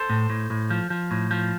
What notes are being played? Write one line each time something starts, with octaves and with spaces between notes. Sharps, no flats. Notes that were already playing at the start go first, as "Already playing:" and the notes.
Already playing: A4 C5
A2
A2
A2
F3
F3
A2
F3